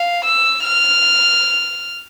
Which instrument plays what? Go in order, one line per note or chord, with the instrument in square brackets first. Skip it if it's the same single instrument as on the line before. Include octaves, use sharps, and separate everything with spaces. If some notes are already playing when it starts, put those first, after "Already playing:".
Already playing: [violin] F5
E6
F6